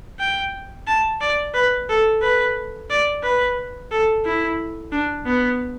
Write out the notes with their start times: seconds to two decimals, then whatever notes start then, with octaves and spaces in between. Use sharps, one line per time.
0.20 G5
0.88 A5
1.21 D5
1.55 B4
1.90 A4
2.22 B4
2.90 D5
3.23 B4
3.92 A4
4.26 E4
4.92 D4
5.27 B3